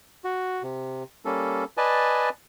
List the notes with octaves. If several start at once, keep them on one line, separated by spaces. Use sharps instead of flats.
F#4
C3
G3 A#3 C#4 A4
B4 D5 D#5 G#5 A5